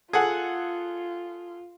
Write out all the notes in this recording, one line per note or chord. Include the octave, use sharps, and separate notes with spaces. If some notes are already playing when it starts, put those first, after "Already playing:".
F4 G#4 A4 F#5